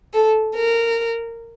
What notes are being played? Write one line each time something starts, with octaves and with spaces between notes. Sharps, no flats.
A4
A#4